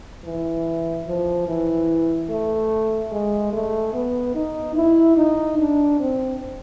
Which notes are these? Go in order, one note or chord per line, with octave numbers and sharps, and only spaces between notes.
E3
F3
E3
A3
G#3
A3
B3
D#4
E4
D#4
D4
C4